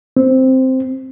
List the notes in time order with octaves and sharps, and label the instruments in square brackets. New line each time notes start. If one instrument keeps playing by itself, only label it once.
[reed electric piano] C4